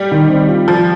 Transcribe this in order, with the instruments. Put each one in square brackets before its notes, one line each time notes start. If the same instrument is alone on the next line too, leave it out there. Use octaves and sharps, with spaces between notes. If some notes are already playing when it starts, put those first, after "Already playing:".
Already playing: [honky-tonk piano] G3
[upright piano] D#3
C4
F4
[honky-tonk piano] F3 [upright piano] F4